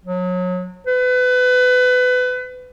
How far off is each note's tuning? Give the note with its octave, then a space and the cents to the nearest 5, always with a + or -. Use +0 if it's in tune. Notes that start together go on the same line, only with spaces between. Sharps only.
F#3 -30
B4 +25